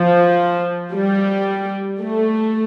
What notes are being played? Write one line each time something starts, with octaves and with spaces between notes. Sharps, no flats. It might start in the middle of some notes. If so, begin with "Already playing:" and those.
Already playing: F3
G3
A3